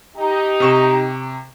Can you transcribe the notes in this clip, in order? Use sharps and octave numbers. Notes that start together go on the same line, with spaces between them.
D#4 G4
C3 C#6 E7